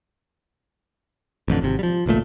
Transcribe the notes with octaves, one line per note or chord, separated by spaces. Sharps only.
A1 F2 D3
G#1 C3
F3 G3
G#1 C#2 A#2 A3